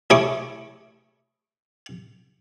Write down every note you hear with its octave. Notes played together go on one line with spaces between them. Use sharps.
A3 E4 G#4 C#5 D6 D#6